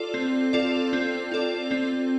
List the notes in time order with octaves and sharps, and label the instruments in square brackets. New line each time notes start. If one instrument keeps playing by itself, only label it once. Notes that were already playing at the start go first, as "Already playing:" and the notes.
Already playing: [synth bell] F4 A4 D5
C4
F4 A4 D5
C4
F4 A4 D5
C4